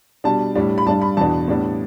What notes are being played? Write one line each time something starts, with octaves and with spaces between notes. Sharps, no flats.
B2 G3 D4 A5
A2 G3 D4
B5
G2 G3 D4 A5
B5
E2 B2 B3 D4 A5
A2 G3 B3 D4